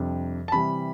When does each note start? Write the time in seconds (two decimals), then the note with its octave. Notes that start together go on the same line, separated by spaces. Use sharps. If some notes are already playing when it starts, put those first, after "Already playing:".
Already playing: F2 C3 G3 D4
0.48 A5
0.52 C3 E3 G3 B5